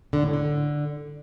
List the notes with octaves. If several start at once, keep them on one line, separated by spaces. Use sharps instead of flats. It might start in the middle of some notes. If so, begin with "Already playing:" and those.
D3
A2
D3